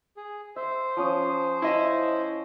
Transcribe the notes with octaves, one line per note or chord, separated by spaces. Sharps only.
G#4
C5 E5
F3 C#4 D#6
E4 D#5 E5